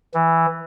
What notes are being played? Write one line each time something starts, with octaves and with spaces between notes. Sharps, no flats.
E3